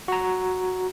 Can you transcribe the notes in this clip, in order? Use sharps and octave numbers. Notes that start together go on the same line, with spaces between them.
F#4 A#5